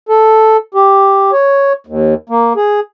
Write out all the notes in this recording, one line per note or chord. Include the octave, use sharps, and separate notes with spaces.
A4
G4
C#5
D#2
A#3
G#4